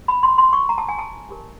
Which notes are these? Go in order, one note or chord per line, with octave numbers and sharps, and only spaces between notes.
B5
C6
C6
C#6
A#5
A5
G#5
A5
D#4 G4 A#4